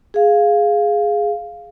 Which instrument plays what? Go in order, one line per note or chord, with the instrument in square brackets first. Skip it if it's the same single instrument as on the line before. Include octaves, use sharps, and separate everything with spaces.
[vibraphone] G#4 F5